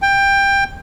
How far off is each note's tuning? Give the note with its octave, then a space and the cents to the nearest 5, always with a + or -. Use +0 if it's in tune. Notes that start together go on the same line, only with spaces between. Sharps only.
G5 +20